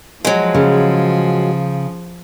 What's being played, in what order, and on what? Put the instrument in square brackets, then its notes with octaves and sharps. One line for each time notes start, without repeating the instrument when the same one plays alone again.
[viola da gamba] F3 [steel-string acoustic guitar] F#3 G#3
[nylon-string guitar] C#3